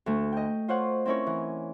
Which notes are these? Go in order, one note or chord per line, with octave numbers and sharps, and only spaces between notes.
D2 A3
D#5 G5
F4 C5 C#5 F#5
C4 C#4 E4 A#4 C#5
E3